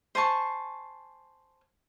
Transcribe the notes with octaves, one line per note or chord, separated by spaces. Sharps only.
C5 G#5 A5 C#6